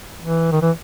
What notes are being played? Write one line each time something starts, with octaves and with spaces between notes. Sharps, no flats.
E3
D#3
E3